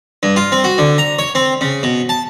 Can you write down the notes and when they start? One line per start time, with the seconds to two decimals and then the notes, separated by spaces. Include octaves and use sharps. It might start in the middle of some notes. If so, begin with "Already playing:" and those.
0.23 G2
0.36 F4
0.52 C4
0.64 F#4
0.78 D3
0.98 A#5
1.19 C#5
1.35 C4
1.61 C#3
1.83 B2
2.09 A5